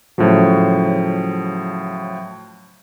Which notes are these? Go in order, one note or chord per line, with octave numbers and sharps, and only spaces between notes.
A2 C#3 F3 F#3